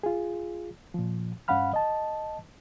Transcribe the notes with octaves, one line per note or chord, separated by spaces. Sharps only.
F4 G#4
A#2 F3
G2 C#4 F5 F#5 B5 F6
D#5 A5